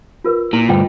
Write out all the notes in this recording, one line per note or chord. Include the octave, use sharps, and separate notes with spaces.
F4 A#4 B4
A#2 E4
D2 G2 F4 D#5 G5